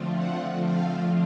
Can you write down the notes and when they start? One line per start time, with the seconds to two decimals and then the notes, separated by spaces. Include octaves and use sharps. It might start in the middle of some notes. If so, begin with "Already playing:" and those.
Already playing: D3 F3 A3 C4 F4
0.16 F#5
0.66 F5